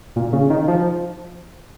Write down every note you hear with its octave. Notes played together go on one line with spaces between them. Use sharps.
A#2
C#3
D#3
F3